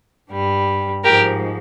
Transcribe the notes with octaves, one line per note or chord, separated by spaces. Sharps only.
G2 G3
G#2 F3 G#3 G4 A#4